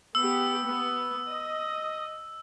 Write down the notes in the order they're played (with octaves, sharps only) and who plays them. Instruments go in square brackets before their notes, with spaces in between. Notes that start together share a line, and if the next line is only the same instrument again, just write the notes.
[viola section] B3 G4 [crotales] E6
[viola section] B3
D#5